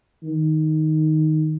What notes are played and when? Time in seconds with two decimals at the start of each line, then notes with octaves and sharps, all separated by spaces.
0.24 D#3